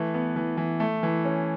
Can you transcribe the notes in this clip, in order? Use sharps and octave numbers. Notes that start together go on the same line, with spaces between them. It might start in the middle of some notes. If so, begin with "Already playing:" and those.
Already playing: E3 A3
B3
E3
E3
A3
E3
C#4